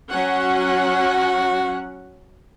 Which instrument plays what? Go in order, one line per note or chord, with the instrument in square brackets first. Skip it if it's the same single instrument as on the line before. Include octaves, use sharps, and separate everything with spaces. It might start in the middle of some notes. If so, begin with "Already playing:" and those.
[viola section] F#3 C#4 F#5 [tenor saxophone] F#4